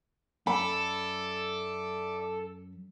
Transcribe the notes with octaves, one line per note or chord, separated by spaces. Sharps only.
F#2 A4 D5 E5 B5 D6